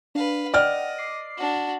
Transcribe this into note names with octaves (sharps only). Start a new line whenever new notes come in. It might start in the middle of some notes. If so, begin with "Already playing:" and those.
D4 B4 F5
D5 D#5 F#5 G5 F6
D6 C7
D4 F#4